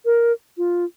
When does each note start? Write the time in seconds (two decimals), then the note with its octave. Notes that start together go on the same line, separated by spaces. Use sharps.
0.05 A#4
0.58 F4